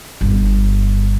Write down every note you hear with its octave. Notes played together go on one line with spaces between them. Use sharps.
G1 G2